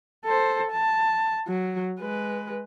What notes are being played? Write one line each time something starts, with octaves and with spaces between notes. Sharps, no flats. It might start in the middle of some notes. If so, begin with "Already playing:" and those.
A4 C5
A5
F#3
G#3 B4